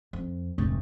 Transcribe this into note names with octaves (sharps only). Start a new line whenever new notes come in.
F2
F1 D2 G#2